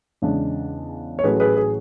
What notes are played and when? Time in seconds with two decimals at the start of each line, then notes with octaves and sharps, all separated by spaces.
0.22 E2 C#3 G#3 D4
1.19 C#5
1.23 A1 A2 F#3 A3 C#4 G#4 B4
1.40 G#4 B4
1.57 G#4